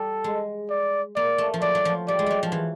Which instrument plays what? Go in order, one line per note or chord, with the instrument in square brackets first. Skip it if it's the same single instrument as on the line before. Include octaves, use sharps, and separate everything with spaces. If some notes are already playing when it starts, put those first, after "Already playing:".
Already playing: [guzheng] G3 [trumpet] A4
[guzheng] G#3
[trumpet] D5
[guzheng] A#3 [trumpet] D5
[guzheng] A3
F3
[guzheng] F#3 [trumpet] D5
[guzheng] F#3
F3
[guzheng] G3 [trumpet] D5
[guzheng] G#3
F#3 G3
F3
E3